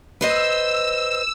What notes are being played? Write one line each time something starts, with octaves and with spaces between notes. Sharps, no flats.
B4 C5 D#5 E6